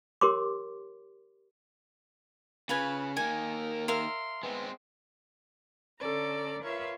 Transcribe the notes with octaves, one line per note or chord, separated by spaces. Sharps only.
G4 A#4 C#5 C6 D6
C#3 F4 B4 G#5
D#3 A#3 A#4 G#5
A#4 E5 F5 C6
G#3 B3 C4
D3 C#4 A4 D5 A#5
F4 A#4 B4 C#5 E5